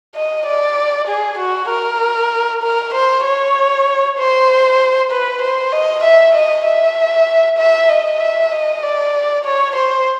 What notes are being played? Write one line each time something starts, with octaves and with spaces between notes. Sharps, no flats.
D#5
D5
G#4
F#4
A#4
A#4
C5
C#5
C5
B4
C5
D#5
E5
D#5
E5
E5
D#5
E5
D#5
D5
C#5
C5